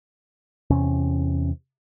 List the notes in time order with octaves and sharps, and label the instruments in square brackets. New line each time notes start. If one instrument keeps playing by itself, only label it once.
[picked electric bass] E2 C3 C#4